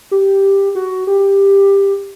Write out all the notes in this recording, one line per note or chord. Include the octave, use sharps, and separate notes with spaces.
G4
F#4
G4